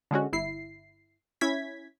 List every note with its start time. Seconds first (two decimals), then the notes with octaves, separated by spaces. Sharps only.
0.11 D3 G#3 C#4 F#4
0.33 G1 E4 C7
1.41 C#4 E4 G#6 B6